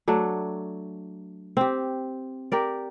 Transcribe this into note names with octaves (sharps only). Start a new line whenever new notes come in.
F#3 A3 D4
C4 G4
G4 A#4 D5